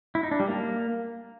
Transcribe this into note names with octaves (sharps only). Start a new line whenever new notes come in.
E4
D#4
D4
G3
A#3